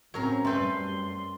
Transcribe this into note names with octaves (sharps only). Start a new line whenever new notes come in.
A2 F#3 C4 C#4 A#4 A#5
F#2 G3 A3 C4 B4 C6